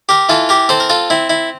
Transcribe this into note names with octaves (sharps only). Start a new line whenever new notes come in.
G4 A#4
E3 F4 A4
G4 A#4
C4 A4 C5
A#4
F4 A4
C4 E4
E4